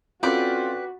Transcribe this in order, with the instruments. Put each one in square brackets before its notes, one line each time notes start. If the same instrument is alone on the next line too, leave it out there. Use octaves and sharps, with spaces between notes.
[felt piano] C4 C#4 A4 [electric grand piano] F4 [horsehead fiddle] F#4 [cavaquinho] B4 D5 G5